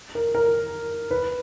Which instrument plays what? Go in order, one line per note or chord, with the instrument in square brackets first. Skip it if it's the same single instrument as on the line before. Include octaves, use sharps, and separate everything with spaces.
[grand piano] A#4
A#4
B4